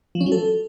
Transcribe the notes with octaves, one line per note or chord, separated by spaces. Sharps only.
F3
C#4
F#3
A4